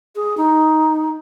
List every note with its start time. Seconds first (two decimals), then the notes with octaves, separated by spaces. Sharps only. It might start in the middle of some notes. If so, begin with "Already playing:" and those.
0.16 G#4
0.37 D#4